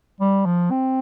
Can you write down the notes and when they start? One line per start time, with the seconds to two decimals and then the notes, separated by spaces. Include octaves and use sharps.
0.21 G3
0.46 F3
0.71 C4